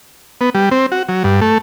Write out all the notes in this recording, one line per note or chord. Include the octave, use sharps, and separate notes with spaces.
B3
G3
C4
F#4
F#3
G2
A3